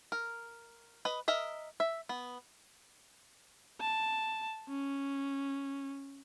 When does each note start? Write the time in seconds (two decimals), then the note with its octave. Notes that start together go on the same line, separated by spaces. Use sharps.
0.12 A#4
1.05 B4 D#5
1.28 A#4 D#5 E5
1.80 E5
2.09 B3
3.80 A5
4.69 C#4